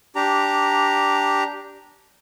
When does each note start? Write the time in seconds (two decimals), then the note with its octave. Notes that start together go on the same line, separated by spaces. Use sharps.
0.16 D4 G4 A#5